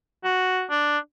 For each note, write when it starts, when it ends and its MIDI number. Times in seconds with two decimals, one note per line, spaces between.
0.24 0.64 66
0.70 0.98 62